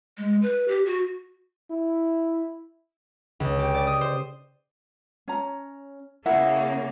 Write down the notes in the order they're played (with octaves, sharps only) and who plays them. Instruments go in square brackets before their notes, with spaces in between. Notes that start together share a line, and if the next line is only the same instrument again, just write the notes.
[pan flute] G#3
B4
G4
F#4
[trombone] E4
[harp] C#2
G4
D5
D#6
C5
[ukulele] C#4 A#5
[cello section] C#3 A#3 [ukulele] E4 A#4 F#5 [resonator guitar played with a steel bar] E5